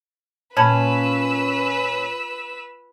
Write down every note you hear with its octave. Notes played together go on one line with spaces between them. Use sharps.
A#2 C#4 B4 A5 B5 E6 G#6